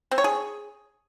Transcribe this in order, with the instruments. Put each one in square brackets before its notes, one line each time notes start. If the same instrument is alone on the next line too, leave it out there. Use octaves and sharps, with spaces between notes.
[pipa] C4
C#5
G#4